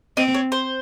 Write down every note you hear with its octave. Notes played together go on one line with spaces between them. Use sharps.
C4 D#5
C#5
C5